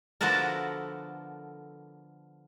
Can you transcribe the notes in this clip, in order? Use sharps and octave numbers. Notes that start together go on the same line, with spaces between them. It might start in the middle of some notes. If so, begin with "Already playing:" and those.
D3 F3 B3 F#4 A4 A#4